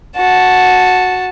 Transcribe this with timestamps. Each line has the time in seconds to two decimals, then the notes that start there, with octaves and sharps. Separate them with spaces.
0.17 F#4 A5